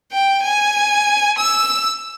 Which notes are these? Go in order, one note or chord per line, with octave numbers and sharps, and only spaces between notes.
G5
G#5
E6